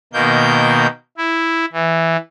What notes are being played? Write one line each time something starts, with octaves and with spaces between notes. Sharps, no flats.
B2 D#3 A#3 G6
E4
E3